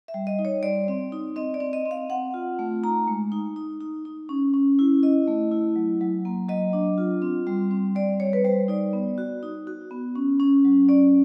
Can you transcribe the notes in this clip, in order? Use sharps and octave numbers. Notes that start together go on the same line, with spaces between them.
E5
G3
D#5
D#4
C#5
G3 D5
C4
D#4
C4 D#5
D5
C4
D#5
C4
F5
C4 F#5
F4
A3
D#4 A#5
G#3
D#4
D#4
D#4
D#4
C#4
C#4
E4
E4 D#5
A3
E4
F#3
F#3
A#3
F#3 D#5
D4
F4
C4
G3
C4
G3 D5
G3 C#5
B4
G3 C5
D#4 D5
B3
F#4
D#4
F#4
B3
C#4
C#4
F#3
C#4 D5